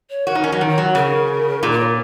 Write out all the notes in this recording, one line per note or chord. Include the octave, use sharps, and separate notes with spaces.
C#5
F#4 A#4
D#4
C#4
F#3
D#3
C#5
F#3
C#3 A#4
A#2 D#4
A#4
C#5